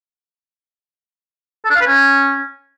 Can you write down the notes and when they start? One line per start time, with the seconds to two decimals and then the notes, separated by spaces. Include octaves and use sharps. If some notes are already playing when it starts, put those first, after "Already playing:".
1.65 A4
1.70 D4
1.76 F5
1.81 B4
1.86 C#4